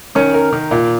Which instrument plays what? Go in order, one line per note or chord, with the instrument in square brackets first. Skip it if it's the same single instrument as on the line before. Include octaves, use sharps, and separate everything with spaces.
[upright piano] D#3 [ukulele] C#4
[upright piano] A#4
D#3
A#2